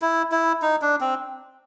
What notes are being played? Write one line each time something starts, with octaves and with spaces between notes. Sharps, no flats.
E4
E4
D#4
D4
C4